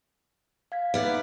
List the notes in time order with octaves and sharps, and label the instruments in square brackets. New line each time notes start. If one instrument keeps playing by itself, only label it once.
[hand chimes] F5 G#6 B6
[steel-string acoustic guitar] B3 D5 [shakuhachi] D#4 [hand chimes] E5 F6 G#6